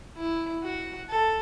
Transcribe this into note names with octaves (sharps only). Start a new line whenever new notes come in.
E4
F#4
A4